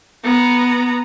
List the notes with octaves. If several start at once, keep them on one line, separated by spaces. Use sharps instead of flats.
B3 A#5